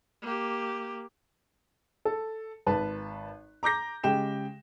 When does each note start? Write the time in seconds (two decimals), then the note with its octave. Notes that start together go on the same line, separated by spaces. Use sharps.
0.22 A#3 G4
2.05 A4
2.67 G#1 B4 A5
3.63 A#5 D6 G6 A#6
4.03 C#3 G#3 G4 G5 E7